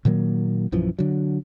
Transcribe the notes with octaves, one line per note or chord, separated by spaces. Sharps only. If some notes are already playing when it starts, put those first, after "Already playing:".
A#2 D#3 F#3 A#3
A#1 F#2 E3 F3
D3 F#3